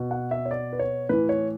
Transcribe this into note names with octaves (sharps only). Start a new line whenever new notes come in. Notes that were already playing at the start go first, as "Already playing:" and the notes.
Already playing: B2
F#5
E5
C#5
D5
B4
C#5
A2 E3 B4
C#5